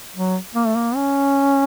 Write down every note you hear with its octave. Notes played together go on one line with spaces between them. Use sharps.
F#3
A#3
A3
A#3
C#4